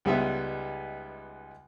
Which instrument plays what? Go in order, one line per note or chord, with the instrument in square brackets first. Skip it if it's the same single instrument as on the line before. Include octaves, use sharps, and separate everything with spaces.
[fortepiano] C#2 G3 G#3 B3 D#4 E5